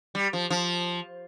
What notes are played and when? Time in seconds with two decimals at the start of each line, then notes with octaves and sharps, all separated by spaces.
0.15 G3
0.33 F3
0.50 F3